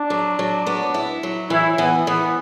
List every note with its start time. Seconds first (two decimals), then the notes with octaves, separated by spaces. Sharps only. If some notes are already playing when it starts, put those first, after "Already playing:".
Already playing: D4
0.10 F#3
0.39 F#3
0.66 B3
0.94 E4
1.23 F#3
1.50 E3 E4
1.78 E3 B3
2.07 E3 B3